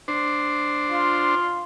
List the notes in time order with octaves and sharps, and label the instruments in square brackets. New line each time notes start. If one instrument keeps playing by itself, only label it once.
[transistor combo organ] D4 C5
[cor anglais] F4